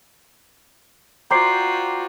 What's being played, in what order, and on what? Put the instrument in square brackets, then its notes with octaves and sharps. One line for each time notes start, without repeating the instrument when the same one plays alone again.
[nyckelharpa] F4 F#4 [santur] C5 D5 G5 [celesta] A#5 C7